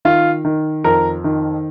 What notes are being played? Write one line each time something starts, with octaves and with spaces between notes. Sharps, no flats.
D#3 F4
D#3
F2 A#4
D#3